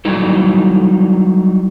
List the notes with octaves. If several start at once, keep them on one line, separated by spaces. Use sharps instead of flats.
F#3 G3 D#4 E4 A4